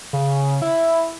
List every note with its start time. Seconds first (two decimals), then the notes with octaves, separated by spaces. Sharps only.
0.13 C#3
0.62 E4